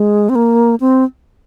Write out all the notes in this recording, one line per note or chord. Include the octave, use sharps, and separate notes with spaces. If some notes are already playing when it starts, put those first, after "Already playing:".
Already playing: G#3
C4
A#3
C4